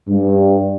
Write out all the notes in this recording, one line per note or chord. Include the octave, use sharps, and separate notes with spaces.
G2